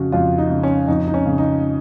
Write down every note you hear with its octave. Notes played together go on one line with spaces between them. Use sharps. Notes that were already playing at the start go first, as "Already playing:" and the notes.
Already playing: F2 C#3 F#4
F2 F4
D#4
C#3
C#4
F2 D#4
D#4
C#4
C#3
D#4